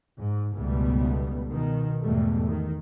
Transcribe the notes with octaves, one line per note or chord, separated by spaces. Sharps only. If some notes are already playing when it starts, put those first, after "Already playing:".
G#2
C#2 G#2 B2 G3 A3 B3
B2 D#3
E2 G#2 B2 G3 A3
D#3